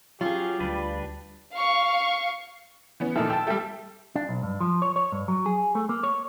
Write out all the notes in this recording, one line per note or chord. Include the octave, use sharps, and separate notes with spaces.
F#3 C#4 F4 G4 G#4
D2 G3 D4 B4
F5 C#6
E3 B3 C#4
A#2 D#3 F3 D#4 A4 E5
G5 A5 E6
G3 A3 A4 E5 G5
D4
B1
G2
F3
C#5
C#5
G2
F#3
G#4
A3
A#3
C#5